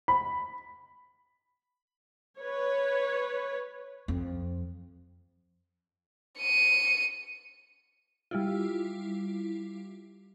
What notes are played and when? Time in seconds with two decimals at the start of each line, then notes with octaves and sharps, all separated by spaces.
0.08 B5
2.40 B4 C#5
4.08 F2
6.40 C#7 D#7
8.31 G3 E4 F4